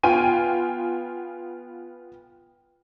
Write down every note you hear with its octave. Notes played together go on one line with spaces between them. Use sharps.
B3 F4 G5 G#5 D#7